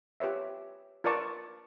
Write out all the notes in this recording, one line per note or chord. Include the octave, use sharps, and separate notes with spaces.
F4 G4 B4 C#5 E5
F4 A#4 B4 D5 A5 C#6